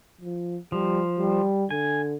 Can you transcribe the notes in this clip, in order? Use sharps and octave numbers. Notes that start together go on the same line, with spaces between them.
F3
F3 G3
G3
D3 G#5